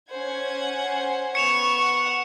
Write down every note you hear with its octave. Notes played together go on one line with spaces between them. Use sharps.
C#4 C5 F#5 G#6
C5
B3 C#6 C#7 E7 F7
F#5